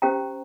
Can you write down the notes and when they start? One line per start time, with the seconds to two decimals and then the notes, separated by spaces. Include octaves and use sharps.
0.02 C#4 G4 C5 G5 A#5